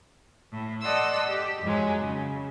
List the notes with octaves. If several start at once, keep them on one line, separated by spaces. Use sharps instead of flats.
A2
A4 D5 D#5 F#5 C6 E6
G4
F2 G#2 F#3 G#3
C#3